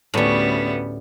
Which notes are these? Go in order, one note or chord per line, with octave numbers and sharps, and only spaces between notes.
D2 A2 G3 B3 C#4